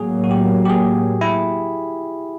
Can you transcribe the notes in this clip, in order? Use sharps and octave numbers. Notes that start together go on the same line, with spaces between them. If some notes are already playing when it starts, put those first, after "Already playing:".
Already playing: A2 F#3 A#3 G#4
F#4
G4
G4
G#4
E4